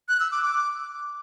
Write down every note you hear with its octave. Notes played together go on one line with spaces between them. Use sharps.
F#6
E6
D6
D6